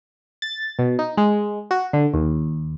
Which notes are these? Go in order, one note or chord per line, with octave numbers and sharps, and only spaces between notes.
A6
B2
D#4
G#3
F#4
D3
D#2